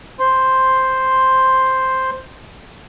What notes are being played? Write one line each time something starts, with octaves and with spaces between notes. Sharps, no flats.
C5 C6